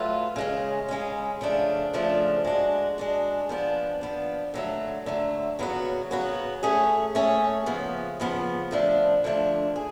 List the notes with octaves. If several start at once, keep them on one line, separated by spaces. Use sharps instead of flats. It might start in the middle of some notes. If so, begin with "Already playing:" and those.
Already playing: F#3 A3 F4 B4
C#3 G#3 C#4
C#3 G#3 C#4
C#3 F3 A3 D4
C#3 F3 A3 D4
G#3 D4 F#4
G#3 D4 F#4
F3 B3 D4
F3 B3 D4
D3 F#3 A3
D3 F#3 A3
C#3 F#3 B3 F#4
C#3 F#3 B3 F#4
A3 C#4 G#4 C#5
A3 C#4 G#4 C#5
C#3 F3 B3
C#3 F3 B3
D3 F3 A3 D4
D3 F3 A3 D4
G#4